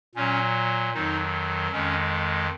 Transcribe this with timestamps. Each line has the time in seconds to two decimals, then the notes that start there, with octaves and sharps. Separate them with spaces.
0.15 A#2 F#3 C#4
0.94 F2 D#3 F#3 D#4
1.72 F2 D#3 G#3 C#4